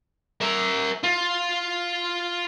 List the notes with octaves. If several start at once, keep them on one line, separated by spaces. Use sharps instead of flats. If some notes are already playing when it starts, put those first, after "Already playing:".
A#4 E5
F4